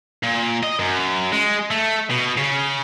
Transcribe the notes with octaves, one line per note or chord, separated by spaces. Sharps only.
A#2
D#5
F#2
G#3
A3
B2
C#3